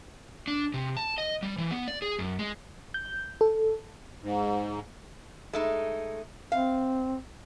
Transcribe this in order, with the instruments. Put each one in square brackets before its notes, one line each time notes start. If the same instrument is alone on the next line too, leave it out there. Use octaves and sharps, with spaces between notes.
[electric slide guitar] D4
C3
A5
D#5
G3
E3
B3
D5
G#4
F#2
G#3
[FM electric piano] G6
A4
[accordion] G#2
[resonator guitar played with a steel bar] G#3 A3 D#4
[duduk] C4 [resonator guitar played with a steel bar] F5